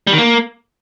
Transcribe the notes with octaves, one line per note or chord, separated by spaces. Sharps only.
G3
D#3
A#3